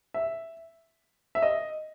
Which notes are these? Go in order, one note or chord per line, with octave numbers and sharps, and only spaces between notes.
E5
E5
D#5